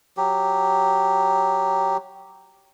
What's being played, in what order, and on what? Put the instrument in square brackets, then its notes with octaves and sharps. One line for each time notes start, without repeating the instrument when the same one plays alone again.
[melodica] F#3 G4